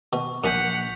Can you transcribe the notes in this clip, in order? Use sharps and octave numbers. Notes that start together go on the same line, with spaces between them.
B2 C#6
A#1 F#2 F#5 G#5 G6 B6 F7